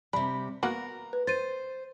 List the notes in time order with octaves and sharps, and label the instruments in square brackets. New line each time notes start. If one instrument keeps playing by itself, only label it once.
[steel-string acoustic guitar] C3 G3 [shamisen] D4 [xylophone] B5
[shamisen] A#3 B3 F#4 [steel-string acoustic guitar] A#4
[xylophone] B4
[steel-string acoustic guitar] C5 [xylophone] A6 D#7